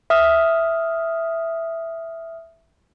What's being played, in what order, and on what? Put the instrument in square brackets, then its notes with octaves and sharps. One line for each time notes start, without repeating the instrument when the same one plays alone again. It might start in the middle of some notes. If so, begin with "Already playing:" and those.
[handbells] E5 D#6 F6